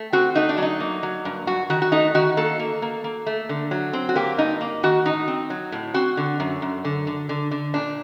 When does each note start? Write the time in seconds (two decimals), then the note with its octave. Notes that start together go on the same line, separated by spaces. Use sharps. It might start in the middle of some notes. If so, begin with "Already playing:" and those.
Already playing: A3
0.13 C4 F#4
0.35 A3 D#4
0.49 D4
0.58 F#3 D#4
0.80 A#3
1.03 F#3
1.25 G2
1.47 G2 F#4
1.70 D#3 F#4
1.82 F#4
1.92 A3 D#4
2.15 D#3 F#4
2.37 A#3 A4
2.59 A#3
2.82 A#3
3.04 A#3
3.27 A3
3.49 D3
3.71 F#3
3.93 C4
4.09 F#4
4.16 A#3 G4
4.38 G2 D#4
4.61 A#3
4.83 D#3 F#4
5.05 A2 D#4
5.28 C4
5.50 F#3
5.72 A2
5.94 C4 F#4
6.17 D3
6.40 F#2
6.62 F#2
6.85 D3
7.07 D3
7.29 D3
7.51 D3
7.74 A#2 D4